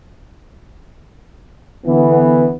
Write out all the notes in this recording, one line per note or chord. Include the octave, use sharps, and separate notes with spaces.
D3 E3 B3